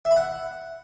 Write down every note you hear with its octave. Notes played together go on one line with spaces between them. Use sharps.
E5
B5
F#5